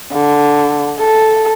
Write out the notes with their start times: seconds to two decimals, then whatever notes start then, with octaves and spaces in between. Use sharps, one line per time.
0.13 D3
0.99 A4